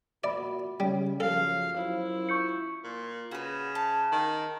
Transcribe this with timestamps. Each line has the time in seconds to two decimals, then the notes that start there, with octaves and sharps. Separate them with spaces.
0.24 A#2 F#4 D5 E5 B5
0.80 C#3 G3 C#4
1.20 F#2 C#3 F3 A4 F5
1.76 F#2 E4 F4 C5
2.29 C#6 G6 C#7
2.84 A#2
3.31 C#3 F#4 B4
3.75 A5
4.12 D#3